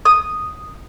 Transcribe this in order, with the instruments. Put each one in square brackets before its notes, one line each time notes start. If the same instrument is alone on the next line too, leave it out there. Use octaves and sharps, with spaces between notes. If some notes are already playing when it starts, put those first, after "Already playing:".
[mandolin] D#6